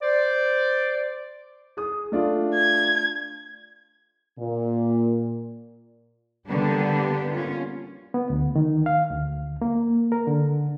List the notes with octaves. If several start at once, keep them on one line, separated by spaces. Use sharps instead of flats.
C5 D5
G#4 D#6
A3 D4 F4
G#6
A#2
D3 G3 A#3 B3 D4 G4
C#4 F4
B3
D2
D#3
F5
D2
A#3
A#4
D3